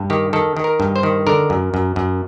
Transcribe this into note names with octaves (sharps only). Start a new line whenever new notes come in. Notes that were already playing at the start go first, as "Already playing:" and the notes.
Already playing: G2
D#3 G4
D#3 A4
D#3
A#4
G2
C5
D#3
D3 A#4
F#2
F#2
F#2